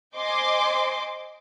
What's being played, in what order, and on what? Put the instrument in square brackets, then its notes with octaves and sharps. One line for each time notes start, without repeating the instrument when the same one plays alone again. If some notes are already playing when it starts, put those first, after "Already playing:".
[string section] C5 D#5 G#5 C6 D6